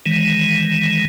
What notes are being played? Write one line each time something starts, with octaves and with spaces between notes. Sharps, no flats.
D#3 E3 G#3